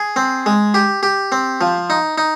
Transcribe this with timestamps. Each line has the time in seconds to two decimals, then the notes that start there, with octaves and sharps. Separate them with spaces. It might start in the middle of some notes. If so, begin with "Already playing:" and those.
Already playing: G#4
0.16 C4
0.46 G#3
0.74 G4
1.03 G4
1.32 C4
1.61 F3
1.90 D#4
2.18 D#4